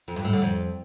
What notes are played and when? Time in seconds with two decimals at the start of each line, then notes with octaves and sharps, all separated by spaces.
0.08 F2
0.16 G2
0.25 A2
0.33 D3
0.42 F2